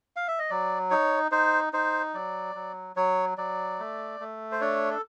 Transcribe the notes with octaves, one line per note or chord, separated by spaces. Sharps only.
F5
E5
D#5
F#3 D5
D#4 C#5
D#4 C5
D#4 C5
F#3 D5
F#3
F#3 C#5
F#3 D5
A3
A3
C5
D4 C#5
A4